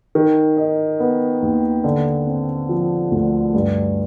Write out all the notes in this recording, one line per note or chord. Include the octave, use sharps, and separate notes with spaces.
D#3
D#4
B3
D#2
D3
C4
F3
D2
G2